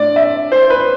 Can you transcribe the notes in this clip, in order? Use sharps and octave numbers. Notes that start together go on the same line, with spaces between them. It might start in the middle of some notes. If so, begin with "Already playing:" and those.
Already playing: A2 D4 D5
E5
C5
B4